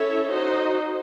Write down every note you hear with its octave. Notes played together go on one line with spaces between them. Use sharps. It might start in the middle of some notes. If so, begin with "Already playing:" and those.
Already playing: C#4 E4 A4 C#5 E5
D#4 F#4 C5 D#5